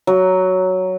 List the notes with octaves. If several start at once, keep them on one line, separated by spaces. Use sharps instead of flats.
F#3